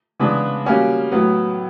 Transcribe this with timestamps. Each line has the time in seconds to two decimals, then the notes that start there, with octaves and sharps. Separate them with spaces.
0.20 C#3 E3 G#3 B3 D4
0.66 G3 A#3 C#4 F#4
1.12 A2 F#3 B3